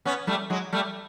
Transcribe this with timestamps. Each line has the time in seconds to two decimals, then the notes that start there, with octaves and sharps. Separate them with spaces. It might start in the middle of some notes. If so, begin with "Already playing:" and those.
0.05 B3 C#4
0.27 G3 A3
0.50 F#3 G#3
0.73 G3 A3